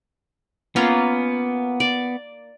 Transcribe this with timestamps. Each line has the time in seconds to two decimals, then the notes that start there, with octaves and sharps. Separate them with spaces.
0.76 A#3 B3 C#4 F4
1.80 D5